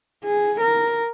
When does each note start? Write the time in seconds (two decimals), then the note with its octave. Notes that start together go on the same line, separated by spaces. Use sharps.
0.25 G#4
0.61 A#4